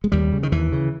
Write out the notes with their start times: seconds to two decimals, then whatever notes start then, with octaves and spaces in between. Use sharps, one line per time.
0.04 G#3
0.12 D#2 G3
0.33 C#3
0.43 D#3
0.52 D#2 E3
0.72 C#3